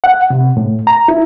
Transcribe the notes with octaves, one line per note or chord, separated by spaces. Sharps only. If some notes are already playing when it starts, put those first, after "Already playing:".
F#5
C3
A2
A#5
E4